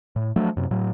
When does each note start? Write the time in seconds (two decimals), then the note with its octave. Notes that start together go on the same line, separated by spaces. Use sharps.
0.16 A2
0.36 F3 F#3 A3 D4
0.57 F#2 C3
0.71 A2 F#3